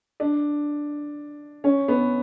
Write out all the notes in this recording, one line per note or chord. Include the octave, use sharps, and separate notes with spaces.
D4
C#4
B3